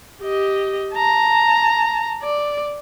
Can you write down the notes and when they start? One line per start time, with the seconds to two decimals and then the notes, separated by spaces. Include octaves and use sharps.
0.23 G4 D#5
0.94 A5 A#5
2.24 D5